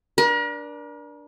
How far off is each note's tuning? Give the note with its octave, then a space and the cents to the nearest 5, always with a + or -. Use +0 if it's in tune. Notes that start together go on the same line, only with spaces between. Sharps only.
D4 +0 A#4 +40